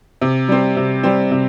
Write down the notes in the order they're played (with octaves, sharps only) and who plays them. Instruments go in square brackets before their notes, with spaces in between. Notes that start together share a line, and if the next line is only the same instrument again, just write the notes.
[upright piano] C3
G3 C4
C3
G3 C4
C3